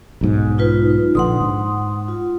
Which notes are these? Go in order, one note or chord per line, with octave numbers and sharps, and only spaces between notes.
B1 G#2
D#4 F4 B4
A#1 D3 F#5 C6 D#6
G#2
F4